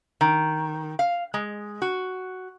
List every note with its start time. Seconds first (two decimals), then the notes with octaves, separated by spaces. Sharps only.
0.21 D#3
0.99 F5
1.34 G#3
1.82 F#4